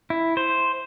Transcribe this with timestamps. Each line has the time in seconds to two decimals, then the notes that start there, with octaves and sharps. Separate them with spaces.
0.10 E4
0.37 C5